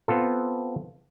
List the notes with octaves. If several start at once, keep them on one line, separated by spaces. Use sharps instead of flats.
B3 C4 F4 A4